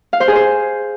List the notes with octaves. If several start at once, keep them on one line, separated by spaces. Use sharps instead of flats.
F5
C5
G#4
C5